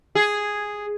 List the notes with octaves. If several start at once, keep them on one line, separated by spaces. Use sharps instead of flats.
G#4